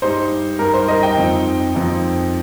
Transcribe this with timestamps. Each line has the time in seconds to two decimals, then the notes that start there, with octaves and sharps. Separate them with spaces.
0.02 G2 G3 D#4 C5
0.59 G2 G3 D#4 A#4
0.74 C5
0.88 A#4 D#5
1.03 D#5 G5
1.17 F2 F3 C4 D#4
1.74 F2 F3 C4 D#4